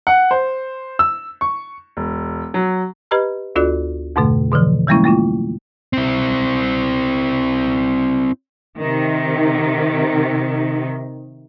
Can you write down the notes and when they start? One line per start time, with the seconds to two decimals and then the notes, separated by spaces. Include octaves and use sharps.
0.07 F#5
0.31 C5
0.99 E6
1.41 C#6
1.97 E1
2.54 F#3
3.11 G4 B4 D#5 A#5 B5 F6
3.56 D2 D4 F4 F#4 A4 D5
4.16 F2 G#2 B2 D3 A3
4.52 B2 D3 E3 F3
4.88 E3 G3 G#3 A#3 C#4 E4
5.04 A3 A#3 E4 F4
5.93 C4 E4
8.78 C3 D#3